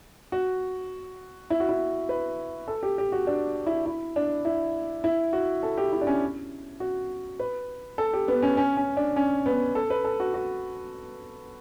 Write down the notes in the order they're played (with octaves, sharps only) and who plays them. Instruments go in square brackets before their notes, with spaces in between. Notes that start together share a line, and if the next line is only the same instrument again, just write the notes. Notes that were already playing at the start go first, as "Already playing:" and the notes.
[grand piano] F#4
E4
F#4
E4
B4
A4
G4
G4
F#4
D4
E4
E4
D4
E4
E4
F#4
A4
G4
E4
D4
C#4
F#4
B4
A4
G4
B3
C#4
C#4
C#4
D4
C#4
B3
A4
B4
A4
F#4
F#4